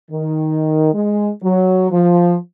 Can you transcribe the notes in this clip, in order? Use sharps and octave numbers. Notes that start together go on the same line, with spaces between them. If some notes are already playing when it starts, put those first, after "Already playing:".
D#3
G#3
F#3
F3